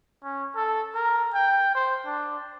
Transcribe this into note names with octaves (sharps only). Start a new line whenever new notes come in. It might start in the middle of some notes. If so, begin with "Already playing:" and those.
C#4
A4
A#4
G5
C5
D4